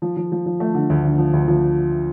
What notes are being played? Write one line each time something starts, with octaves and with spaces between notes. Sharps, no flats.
F3
F3
F3
F3
A3
D3
D2
D3
F3
D2
F3